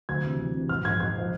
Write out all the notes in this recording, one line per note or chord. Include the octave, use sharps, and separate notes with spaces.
D2 G#6
C3 E3
D2
C3 E3
G#1 F6
G#2 F3 G#6
G#1 G#6
F3